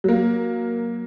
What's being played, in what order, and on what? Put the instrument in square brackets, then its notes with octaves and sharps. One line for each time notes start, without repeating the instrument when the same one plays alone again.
[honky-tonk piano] F#3 A#3